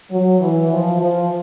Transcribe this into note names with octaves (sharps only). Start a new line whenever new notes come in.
F#3
E3
F3
F3